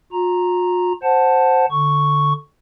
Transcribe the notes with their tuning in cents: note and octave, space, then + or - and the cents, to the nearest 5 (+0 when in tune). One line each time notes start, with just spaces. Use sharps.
F4 +45 A#5 +0
C5 +0 F#5 +0 A5 +0
D3 +0 C#6 +0